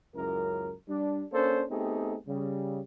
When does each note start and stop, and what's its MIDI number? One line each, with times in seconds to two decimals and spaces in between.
0.15 0.73 37
0.15 0.73 42
0.15 0.73 64
0.15 0.73 70
0.89 1.23 55
0.89 1.23 62
1.32 1.63 58
1.32 1.63 61
1.32 1.63 62
1.32 1.63 69
1.32 1.63 72
1.70 2.16 57
1.70 2.16 59
1.70 2.16 60
1.70 2.16 63
1.70 2.16 67
1.70 2.16 68
2.27 2.81 49
2.27 2.81 55